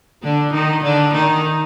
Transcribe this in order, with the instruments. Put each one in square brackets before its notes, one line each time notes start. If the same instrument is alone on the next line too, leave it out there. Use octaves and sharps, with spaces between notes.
[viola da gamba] D3 D4
D#3 D#4
D3 D4
D#3 D#4